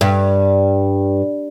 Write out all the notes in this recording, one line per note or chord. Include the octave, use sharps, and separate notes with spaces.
G2